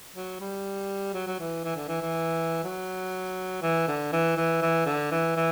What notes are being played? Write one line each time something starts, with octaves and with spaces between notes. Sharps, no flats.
F#3
G3
F#3
F#3
E3
E3
D3
E3
E3
F#3
E3
D3
E3
E3
E3
D3
E3
E3